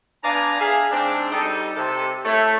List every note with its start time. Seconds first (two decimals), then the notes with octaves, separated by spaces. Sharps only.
0.24 B3 D4 D5 F5 G#5 A#5
0.60 G#4 E5 F5
0.91 G#2 C4 D4
1.32 G3 D#4 A4
1.76 C3 A4
2.25 A3 E4 C#5